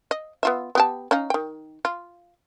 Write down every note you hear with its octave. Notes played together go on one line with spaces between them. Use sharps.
D#5
B3 F4 E5
B3 G4 A5
C#4 D#4 F5
D#3 G5
F4